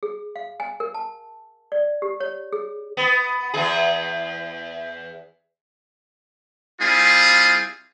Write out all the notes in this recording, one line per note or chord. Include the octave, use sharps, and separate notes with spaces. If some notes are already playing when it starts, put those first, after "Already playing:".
G#4
F5
G#5
A#4
A5
D5
G4
C#5
G#4
B3
E2 G#4
G3 C4 E4 F4 G#4